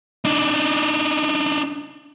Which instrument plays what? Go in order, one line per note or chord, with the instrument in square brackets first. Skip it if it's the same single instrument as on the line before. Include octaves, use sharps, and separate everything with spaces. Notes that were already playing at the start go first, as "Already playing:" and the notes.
[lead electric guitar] D4 D#4